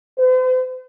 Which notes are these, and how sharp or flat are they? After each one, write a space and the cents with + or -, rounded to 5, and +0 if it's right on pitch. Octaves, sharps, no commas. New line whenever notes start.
C5 -45